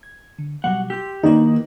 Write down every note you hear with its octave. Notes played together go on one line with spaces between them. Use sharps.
G#6
D3
B2 F#3 G3 F#5
G4 C6 E6
D#3 A#3 D#4 E4 B4